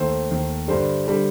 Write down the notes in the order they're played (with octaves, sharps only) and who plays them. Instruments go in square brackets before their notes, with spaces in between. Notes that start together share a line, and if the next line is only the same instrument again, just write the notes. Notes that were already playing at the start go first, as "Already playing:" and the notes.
Already playing: [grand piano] D#2 D#3 A3 C5
D#2 D#3 A3
G2 D3 G3 C5
D3 G3